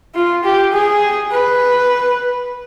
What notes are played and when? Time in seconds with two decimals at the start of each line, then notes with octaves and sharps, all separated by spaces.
0.15 F4
0.44 G4
0.73 G#4
1.32 B4